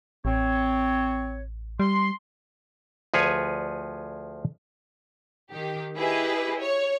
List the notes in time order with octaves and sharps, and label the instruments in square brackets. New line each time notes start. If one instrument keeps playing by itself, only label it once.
[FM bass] A1 [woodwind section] C4 C#5
[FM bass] G3 [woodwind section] C6
[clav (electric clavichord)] D2 F3 G#4 B4 C#5 G#5
[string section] D#3 G4
E4 G4 G#4 B4 D#5
C#5